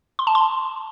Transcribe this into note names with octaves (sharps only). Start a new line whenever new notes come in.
C6
A5
C6